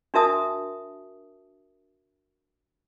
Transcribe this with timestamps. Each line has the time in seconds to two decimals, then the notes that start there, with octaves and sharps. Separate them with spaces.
0.14 D4 F#4 A#4 E5 A5 D#6